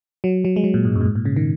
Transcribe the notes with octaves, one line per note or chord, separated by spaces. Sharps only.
F#3
F#3
G#3
F#3
A#2
G#2
F#2
A#2
G#2
A#2
C#3
D#3